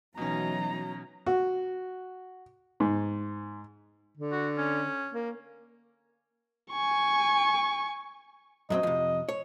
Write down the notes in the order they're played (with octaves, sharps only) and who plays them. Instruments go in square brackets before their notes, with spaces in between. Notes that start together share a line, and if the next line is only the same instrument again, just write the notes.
[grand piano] B2 C#4 [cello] E3 D#4 [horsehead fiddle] F#3 A#5
[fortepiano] F#4
G#2
[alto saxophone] D3
[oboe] F#4
C#4
[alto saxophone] A#3
[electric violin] G#5 C#6
[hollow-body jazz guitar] F#2 F#3 C4 [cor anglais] D#5
[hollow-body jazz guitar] F2 C3
C#5